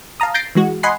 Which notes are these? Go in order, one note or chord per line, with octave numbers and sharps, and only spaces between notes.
F5 A5 A#5 D#6
G6 A6 A#6 C7 D7
E3 G#3 F#4
D#5 F#5 G#5 B5 C6 C7